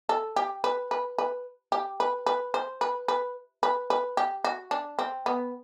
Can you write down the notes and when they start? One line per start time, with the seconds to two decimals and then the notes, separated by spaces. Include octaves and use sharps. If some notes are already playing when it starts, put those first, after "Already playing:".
0.09 A4
0.36 G4
0.64 B4
0.91 B4
1.18 B4
1.72 G4
2.00 B4
2.26 B4
2.54 C5
2.81 B4
3.08 B4
3.63 B4
3.90 B4
4.17 G4
4.44 F#4
4.71 D4
4.99 C4
5.26 B3